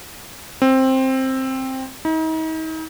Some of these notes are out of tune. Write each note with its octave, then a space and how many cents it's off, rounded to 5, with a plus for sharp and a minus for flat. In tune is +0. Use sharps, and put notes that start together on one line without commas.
C4 +10
D#4 +40